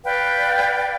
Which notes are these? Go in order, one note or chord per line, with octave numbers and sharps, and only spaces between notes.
B4 D5 F5 G5